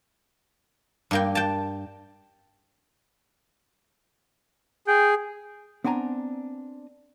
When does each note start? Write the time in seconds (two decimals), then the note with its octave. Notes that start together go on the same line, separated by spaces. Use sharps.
1.11 G2 A#3 G5
1.35 G5 A5
4.87 G#4 G5
5.84 B3 C4 D4 G#5 A#5